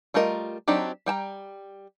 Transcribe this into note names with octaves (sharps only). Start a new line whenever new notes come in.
G3 A3 F4 A#4 D#5
F#3 C4 D4 D#4 G4
G3 G5 A5 A#5